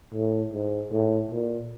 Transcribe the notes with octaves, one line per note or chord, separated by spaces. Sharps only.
A2
G#2
A2
A#2